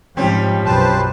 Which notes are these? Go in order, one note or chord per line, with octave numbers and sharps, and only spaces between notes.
G#2 F3 G3 C4 C#4
B1 F#2 B4 C5 A5